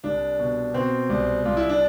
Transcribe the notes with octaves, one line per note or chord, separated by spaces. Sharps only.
C2 D4
B2
B2 C4
C2
C2 F4
E4
D4